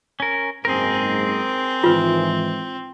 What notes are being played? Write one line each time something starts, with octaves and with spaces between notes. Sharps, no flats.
C#4 A#4
F#1 G#2 C4 G#4 A#4
G#2 D#3 E3 F4 B4